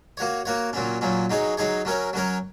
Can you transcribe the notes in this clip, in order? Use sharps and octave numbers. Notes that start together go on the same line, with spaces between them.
A#3 F#4 C#5
A#3 F#4 C#5
A#2 F#3 C#4
A#2 F#3 C#4
F#3 D#4 G#4 C#5
F#3 D#4 G#4 C#5
F#3 C#4 A#4 C#5
F#3 C#4 A#4 C#5